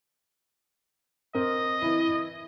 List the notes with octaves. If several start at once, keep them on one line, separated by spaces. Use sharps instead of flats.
C4 A#4 D#5
E3 E4